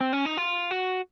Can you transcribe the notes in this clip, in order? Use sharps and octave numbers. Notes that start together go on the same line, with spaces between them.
C4
C#4
D#4
F4
F#4